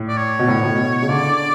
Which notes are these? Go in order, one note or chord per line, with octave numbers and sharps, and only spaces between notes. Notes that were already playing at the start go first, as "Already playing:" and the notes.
Already playing: A2
D5
C#5
B2
A2
A2
B2
C#3
D3 D5